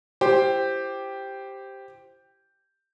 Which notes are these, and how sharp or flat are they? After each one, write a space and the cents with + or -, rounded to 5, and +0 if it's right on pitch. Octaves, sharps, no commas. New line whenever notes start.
E4 +30 G4 +0 C5 +0